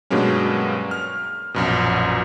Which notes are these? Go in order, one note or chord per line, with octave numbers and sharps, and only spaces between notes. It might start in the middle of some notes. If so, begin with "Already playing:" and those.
G2 B2 F#3 G#3 A#3 C#4
F6
A#1 F#2 B2